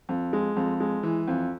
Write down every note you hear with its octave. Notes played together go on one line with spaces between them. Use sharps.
F2
G#3
F2
G#3
E3
F2